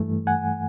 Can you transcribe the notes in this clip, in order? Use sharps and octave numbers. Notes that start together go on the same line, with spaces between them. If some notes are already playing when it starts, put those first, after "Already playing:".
Already playing: G2 E3 A3
F#5 G#5